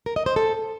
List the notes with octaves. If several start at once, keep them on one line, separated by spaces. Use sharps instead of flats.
A#4
D#5
C5
A4